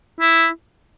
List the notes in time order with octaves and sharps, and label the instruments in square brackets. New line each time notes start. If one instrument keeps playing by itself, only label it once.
[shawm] E4